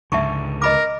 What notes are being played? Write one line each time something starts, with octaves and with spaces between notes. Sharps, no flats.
C#2 G#2 D3 E5 A5 C#6
A#4 D#5 B5 D6